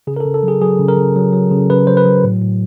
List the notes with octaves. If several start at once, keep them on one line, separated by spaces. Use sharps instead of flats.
C#3 G#4
A#4
A4
C#3
A4
F#3
G#4
F#3 G#4
C#3
A#4
C#3
F#3
F#3
C#3
C#3 B4
F#3 C5
B4
F#3
A2
A2